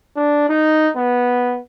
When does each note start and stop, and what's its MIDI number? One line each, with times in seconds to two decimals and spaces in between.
0.16 0.45 62
0.49 0.89 63
0.97 1.59 59